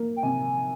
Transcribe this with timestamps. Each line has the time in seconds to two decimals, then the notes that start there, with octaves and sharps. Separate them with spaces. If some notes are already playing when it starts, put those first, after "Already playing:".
Already playing: A#3
0.16 G5
0.23 C3 G#5